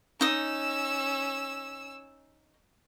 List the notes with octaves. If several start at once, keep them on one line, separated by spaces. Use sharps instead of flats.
C#4 D#4 D#6 E6